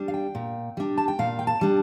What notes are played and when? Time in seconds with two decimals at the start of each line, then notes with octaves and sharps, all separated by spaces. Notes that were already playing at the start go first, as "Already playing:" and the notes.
Already playing: G3 D4
0.08 F5
0.14 G5
0.35 A#2
0.77 G3 D4
0.98 A5
1.08 G5
1.19 A#2 F5
1.39 G5
1.47 A5
1.61 G3 D4